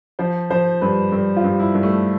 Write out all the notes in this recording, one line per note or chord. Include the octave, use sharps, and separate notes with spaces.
F3 C5
F3 C5
G2 B4
G2
F4
G2
E4
G2
A3